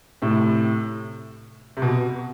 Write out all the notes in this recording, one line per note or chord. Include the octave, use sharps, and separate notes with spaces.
A2 C3
C3
B2